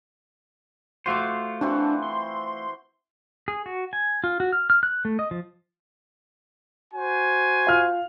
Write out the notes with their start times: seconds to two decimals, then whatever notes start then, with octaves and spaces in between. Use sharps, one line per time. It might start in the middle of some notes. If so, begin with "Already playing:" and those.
1.06 A3 F4 F#4 C5 D6
1.61 E3 C4 D4 F#4
2.02 C6
3.48 G#4
3.66 F#4
3.93 G#5
4.24 F4
4.40 F#4
4.52 F6
4.70 F6
4.83 F#6
5.05 A3
5.19 D#5
5.31 F3
6.94 F#4 C5 G#5
7.67 F4 F6